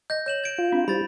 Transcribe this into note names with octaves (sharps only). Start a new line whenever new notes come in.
D#5 G6 A#6
C#5 G6 E7 F#7
G#6 D7
F4
C4 D4
G3 E4 C5 B5 A6